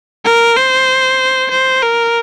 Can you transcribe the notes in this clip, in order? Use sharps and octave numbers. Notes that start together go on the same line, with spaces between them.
A#4
C5
C5
A#4